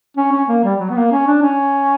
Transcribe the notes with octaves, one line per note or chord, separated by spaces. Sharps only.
C#4
C#4
A#3
G3
F#3
B3
A#3
C#4
D4
C#4